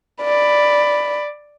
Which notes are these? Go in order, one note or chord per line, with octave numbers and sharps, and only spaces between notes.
D5 B5